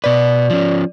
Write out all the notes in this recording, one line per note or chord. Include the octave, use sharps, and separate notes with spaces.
B2 B4 D5
F3 C#4